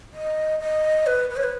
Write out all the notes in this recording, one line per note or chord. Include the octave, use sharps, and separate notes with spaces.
D#5
D#5
B4
B4
C#5
B4